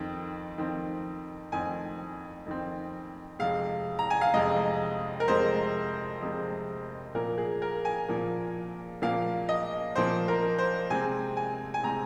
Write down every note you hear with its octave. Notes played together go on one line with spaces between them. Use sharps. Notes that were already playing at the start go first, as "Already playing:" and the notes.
Already playing: F2 D#3 C4
F2 D#3 C4
F2 D#3 C4 G#5
F2 D#3 C4
F2 C3 G#3 F5
A#5
G#5
F5
F2 C3 G#3 D#5
A#4
F2 C3 G#3 C5
F2 C3 G#3
A#2 F3 A#3 A#4
G#4
A#4
G#5
A#2 F3 A#3
A#2 F3 A#3 F5
D#5
A#2 F3 A#3 C5
A#4
C5
C3 G#3 C4 G#5
G#5
G#5
C3 G#3 C4 A#5